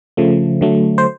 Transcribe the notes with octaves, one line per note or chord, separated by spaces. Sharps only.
C#3 F3 A3
D3 F#3 A3
C5